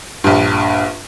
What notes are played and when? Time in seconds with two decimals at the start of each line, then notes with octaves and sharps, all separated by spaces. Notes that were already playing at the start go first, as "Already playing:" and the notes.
0.24 A#1 G2